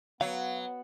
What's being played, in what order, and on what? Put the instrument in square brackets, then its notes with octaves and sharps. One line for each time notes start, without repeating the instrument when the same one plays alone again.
[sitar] F#3 [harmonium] B3 [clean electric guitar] F5